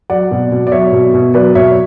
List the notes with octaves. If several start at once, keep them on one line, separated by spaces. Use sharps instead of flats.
F#3 D5 F#5
B2
B2
D5
F#3 C#5 E5
B2
B2
F#3 B4 D5
B2 C#5 E5